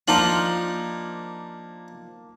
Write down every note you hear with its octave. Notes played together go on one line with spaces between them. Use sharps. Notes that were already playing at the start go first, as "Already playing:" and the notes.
F3 A#3 D4 D#4 F4 A5 F#7